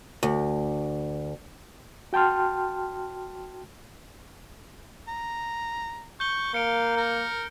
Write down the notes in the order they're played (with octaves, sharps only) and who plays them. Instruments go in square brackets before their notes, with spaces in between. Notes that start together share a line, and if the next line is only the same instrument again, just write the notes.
[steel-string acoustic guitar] D2
[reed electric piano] F#4 G5 A5 C6 F6
[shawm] A#5
[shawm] C#6 [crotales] G6 G7
[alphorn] A#3 [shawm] F5 [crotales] C#7 D7
[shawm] A#4